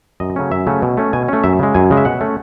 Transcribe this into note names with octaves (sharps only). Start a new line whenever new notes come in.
F#2 D#5
C#3 F#3 A3 C#4
F#2 E5
C#3 F#3 A3 C#4
B2
A3 C#4
B2 G#5
A3 C#4
F#2 E5
C#3 G#3
F#2 G#5
C#3 G#3
E5
B2 F#5
A3 C#4